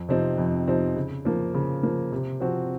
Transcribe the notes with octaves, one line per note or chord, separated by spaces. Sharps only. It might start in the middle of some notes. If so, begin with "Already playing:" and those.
Already playing: F2
C3 F3 C4 D#4
F2
C3 F3 C4 D#4
C#3
F3 A#3
C#3
F3 A#3
C3
F3 C4 F#4